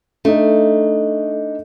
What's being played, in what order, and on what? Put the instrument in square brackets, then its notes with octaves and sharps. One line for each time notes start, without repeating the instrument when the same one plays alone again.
[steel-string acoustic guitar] A3 [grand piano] D4 D#4